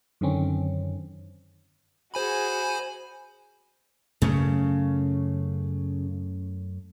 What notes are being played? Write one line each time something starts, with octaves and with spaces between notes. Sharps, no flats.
F#2 D3 D#3 C4 C#4
F#4 G#4 C5 G#5 B5
F#2 C#3 A3 C#4